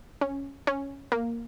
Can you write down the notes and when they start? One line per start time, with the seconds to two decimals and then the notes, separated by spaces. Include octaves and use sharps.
0.21 C#4
0.67 C#4
1.12 A#3